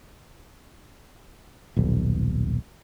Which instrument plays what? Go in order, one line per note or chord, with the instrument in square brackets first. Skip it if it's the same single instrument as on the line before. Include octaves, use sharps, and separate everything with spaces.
[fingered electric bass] D#1 B1